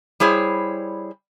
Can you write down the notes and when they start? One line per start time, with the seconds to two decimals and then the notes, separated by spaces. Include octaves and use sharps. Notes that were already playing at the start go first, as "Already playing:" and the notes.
0.20 G3 E4 G#4 C5 C#5